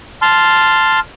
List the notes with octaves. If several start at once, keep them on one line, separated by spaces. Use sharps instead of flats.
A5 C6 F6